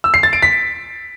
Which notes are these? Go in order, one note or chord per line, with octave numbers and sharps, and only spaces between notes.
E6
C7
A6
D7
B6